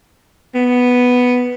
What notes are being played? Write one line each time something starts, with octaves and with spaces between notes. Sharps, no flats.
B3